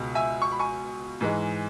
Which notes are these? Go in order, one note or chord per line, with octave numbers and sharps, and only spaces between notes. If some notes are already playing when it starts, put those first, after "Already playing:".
Already playing: C#2 B2 G#3
E5 G#5
C#6
B5
G#5 C#6
G#2 E3 G#3